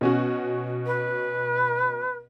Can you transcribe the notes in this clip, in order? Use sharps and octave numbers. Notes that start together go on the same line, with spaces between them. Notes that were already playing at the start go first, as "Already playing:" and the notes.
B2 C#4 F#4
B4